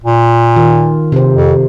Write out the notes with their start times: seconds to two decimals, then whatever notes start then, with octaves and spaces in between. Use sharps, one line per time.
0.04 A#2
0.56 D#3 F4
1.12 C3 C5
1.33 F2